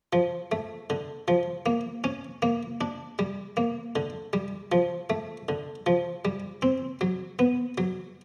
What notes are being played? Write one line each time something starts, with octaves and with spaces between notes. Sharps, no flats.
F3
A3
D3
F3
A#3
C#4
A#3
D4
G3
A#3
D3
G3
F3
A3
D3
F3
G3
C4
F#3
B3
F#3